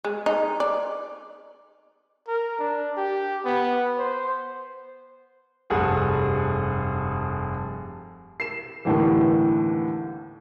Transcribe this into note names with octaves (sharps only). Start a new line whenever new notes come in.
G#3
D#4
D5
A#4
D4
G4
B3
C5
F1 G2 G#4 A4 F#5 A5
C7 E7
G1 D#2 A2 D3 E3